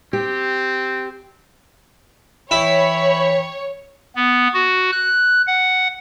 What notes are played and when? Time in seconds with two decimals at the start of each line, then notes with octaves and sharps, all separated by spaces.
0.13 C4 G4
2.51 E3 E4 C#5 G5 B5
4.15 B3
4.53 F#4
4.92 F#6
5.47 F#5